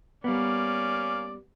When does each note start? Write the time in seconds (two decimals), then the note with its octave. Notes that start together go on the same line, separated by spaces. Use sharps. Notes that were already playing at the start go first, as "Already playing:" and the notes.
0.24 G3 A#3 B3 C#4 D5